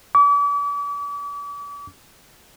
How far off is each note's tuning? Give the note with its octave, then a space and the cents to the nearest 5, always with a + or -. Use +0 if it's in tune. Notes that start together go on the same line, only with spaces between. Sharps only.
D6 -40